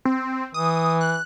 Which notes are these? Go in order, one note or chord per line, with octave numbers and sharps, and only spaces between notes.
C4
E3 D#6
F#6